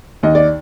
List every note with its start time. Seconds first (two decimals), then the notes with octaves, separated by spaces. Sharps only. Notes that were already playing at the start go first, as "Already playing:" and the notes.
0.23 D#2 D#5
0.35 D5